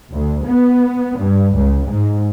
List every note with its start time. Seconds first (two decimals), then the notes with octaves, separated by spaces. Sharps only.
0.12 D2
0.46 B3
1.18 G2
1.55 C#2
1.88 G#2